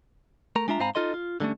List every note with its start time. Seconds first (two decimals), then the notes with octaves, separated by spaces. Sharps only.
0.56 A3 A#4 A#5
0.68 G#3 D4 F4 E5 A#5
0.80 G#2 C4 F5 G#5 A#5 B5
0.95 D#4 F4 A4 D#5 C6
1.14 F4
1.40 D3 F3 G3 A3 C#4